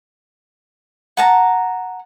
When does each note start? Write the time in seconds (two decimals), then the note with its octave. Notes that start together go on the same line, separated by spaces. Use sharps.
1.17 F#5 A5 A#5